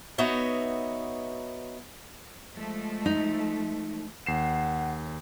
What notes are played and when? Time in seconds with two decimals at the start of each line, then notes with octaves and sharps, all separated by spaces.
0.18 B3 D#4 F#4 C#5 E5
2.54 F3 G#3 A3
3.06 D#4
4.26 D#2 F#5 C7 E7